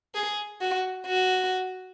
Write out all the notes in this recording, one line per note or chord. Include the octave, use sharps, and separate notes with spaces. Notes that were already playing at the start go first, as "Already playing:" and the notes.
G#4
F#4
F#4